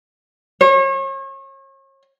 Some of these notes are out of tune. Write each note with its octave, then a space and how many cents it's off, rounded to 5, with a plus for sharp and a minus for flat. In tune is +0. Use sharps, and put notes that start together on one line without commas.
C#5 -40